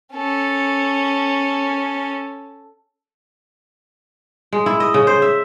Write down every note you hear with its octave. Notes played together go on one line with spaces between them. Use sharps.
C#4 A4
G#3
E4
D#5
C#3
C5
E5